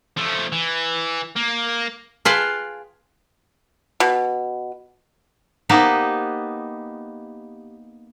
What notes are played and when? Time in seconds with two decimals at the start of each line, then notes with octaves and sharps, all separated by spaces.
0.18 F3 A3
0.52 E3
1.36 A#3
2.25 F4 G#4 B4 F5 G5 A5
4.00 B2
5.69 A#3 B3 D#4 G4 B4 C5